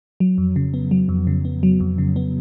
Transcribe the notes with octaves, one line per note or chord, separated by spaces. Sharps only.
F#3
F2
C#3
B3
F#3
F2
C#3
B3
F#3
F2
C#3
B3